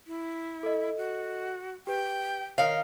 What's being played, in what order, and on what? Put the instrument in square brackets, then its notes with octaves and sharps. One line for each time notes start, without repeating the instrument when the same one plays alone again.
[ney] E4
[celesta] A4 D#5
[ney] F#4
[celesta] G4 B4 [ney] G5
[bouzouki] D#3 F5 [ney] A#4 [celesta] C#5